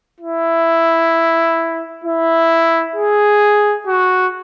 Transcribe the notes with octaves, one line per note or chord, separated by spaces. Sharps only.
E4
E4
G#4
F#4